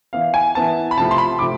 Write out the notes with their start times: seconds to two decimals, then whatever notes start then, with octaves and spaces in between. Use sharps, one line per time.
0.13 E3 B3 E4 F5
0.34 G#5
0.55 E3 B3 E4 A5
0.91 B5
0.97 C3 F3 A3 A5
1.11 C6
1.18 B5
1.39 C3 F3 A3 D6